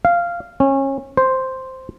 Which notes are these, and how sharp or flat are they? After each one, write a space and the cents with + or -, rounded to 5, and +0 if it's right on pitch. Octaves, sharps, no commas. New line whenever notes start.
F5 -10
C#4 -25
C5 +0